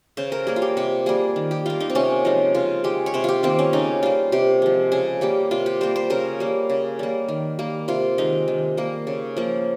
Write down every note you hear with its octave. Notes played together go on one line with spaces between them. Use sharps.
C#3 C5
A#4
G3 A#3 G#4
F4
G4
C3 G4
G3 A#3 G#4
D#3
G4
G3 A#3 F4
D#4
C4
C3 C#4
F3 G#3 D#4
C#3 F4
G#3 G4
C#5
C3 C5
F4 G4
D#3 A#3 C4
C#4
C#3 D#4
G3 A#3 F4
C3 G4
F3 G#3
C#3 G#4
G3 A#3 G4
C3 F4
G4
G3 A#3 C5
C5
C#3 A#4
G3 A#3
C#3
G3 A#3
D#3
G3 A#3
C3 F4
D#3 G#3 D#4
D#3
G3 A#3
C#3
F3 A#3